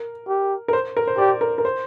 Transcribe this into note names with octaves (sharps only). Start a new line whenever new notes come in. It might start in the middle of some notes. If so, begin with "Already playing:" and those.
Already playing: A#4
G4
A#4
C5
A#4
C5
G4 D5
A#4
A#4
C5